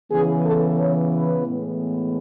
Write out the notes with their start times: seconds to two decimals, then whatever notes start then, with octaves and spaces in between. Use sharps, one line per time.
0.11 C#3 E3 B3 G#4
0.45 A4
0.80 C#5
1.13 B4
1.46 A2 E3 G#3 B3